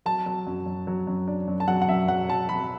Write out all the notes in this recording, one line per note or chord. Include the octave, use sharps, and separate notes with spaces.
F#3 A5
F#3
F#2
F#2
F#3
F#2
D4
F#2
A5
F#3 F#5
F#5
F#2 E5
F#3 F#5
F#3 A5
F#3 B5